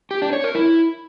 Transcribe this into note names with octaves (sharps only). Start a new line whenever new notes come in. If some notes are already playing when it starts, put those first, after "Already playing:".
G4
D4
C#5
A#4
E4